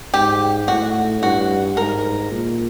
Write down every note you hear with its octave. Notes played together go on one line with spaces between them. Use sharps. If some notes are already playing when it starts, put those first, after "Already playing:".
G#2 G4
A2 F#4
G2 F#4
G#2 A#4
A#2